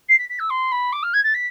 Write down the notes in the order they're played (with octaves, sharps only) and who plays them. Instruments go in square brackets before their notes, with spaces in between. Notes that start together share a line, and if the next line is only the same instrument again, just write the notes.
[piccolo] C7
B6
B6
E6
C6
B5
D6
F6
G#6
A6
B6